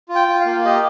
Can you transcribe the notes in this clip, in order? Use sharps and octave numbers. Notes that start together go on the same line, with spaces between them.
F4
G5
F4
F5
A#3
G4 D#5